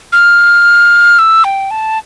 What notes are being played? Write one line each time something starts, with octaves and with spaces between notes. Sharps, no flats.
F6
E6
G5
A5